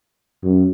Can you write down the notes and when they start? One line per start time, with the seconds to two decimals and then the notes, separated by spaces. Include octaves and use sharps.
0.43 F#2